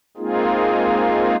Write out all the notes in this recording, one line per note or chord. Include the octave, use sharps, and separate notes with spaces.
G#3 A#3 C4 D#4 F4 G#4